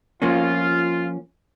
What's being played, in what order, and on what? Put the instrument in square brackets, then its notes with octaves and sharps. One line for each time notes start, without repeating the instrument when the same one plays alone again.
[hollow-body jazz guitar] F3 A#3 C#4 [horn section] F4